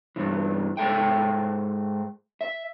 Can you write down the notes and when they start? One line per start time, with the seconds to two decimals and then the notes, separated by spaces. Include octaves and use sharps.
0.16 E2 G2 E3
0.77 G#2 A3 A4 E5 G5
2.41 E5